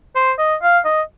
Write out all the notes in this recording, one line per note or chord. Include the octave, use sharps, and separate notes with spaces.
C5
D#5
F5
D#5